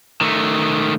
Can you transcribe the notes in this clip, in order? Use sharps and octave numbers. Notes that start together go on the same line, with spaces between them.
D#3 A3